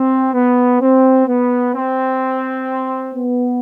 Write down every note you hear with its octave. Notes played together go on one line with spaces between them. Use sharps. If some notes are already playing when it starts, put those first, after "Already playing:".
Already playing: C4
B3
C4
B3
C4
B3